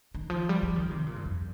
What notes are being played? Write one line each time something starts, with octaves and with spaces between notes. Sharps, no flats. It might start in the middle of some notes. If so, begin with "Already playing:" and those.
D#3
F3
G3
F3
D#3
C3
A#2
G2
F2